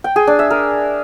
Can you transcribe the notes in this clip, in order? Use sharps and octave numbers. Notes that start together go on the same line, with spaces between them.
G5
G#4
D4
E5
A#4